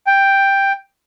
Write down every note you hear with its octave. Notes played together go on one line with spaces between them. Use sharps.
G5